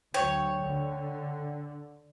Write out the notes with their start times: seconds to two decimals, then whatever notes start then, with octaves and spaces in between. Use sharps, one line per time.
0.14 D2 F#3 C#5 G5
0.65 D3